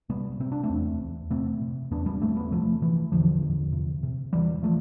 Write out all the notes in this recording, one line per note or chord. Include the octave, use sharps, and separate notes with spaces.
C3 G3 B3
C3 C4
D4
A3 C4
E2
E2
C3 A3 C4
C3
E2 B3 D4
G3 B3
E2 A3 C4
G3 B3
C3 F3 A3
C3 E3
E2 D3 F3
E2
C3
C3
E2 E3 G3
F3 A3